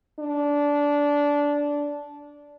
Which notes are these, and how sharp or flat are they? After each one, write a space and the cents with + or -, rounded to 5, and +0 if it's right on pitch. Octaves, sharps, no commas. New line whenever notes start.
D4 -15